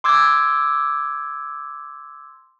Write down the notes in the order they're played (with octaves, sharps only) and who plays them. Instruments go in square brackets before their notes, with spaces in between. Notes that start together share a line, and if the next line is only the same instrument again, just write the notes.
[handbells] C6 D6 E6 G#6